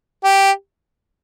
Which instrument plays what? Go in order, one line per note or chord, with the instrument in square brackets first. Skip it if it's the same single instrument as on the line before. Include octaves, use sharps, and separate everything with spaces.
[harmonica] G4